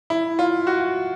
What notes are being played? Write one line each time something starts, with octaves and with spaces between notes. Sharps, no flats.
E4
F4
F#4